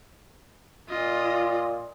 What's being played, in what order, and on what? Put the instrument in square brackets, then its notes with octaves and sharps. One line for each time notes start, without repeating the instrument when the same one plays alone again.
[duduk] A#2 [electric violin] F4 D#5